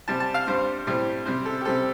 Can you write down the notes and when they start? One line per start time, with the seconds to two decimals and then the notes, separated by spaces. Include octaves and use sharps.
0.08 C3 G3 C4 A5
0.20 A5
0.34 F5
0.46 G2 G3 C4 C5
0.87 A2 G3 C4
1.25 C3 G3 C4 C5
1.45 A4
1.61 G4
1.65 C3 G3 C4 A4